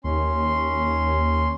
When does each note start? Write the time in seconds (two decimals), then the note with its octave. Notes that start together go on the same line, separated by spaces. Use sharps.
0.04 D#2 C#4 C6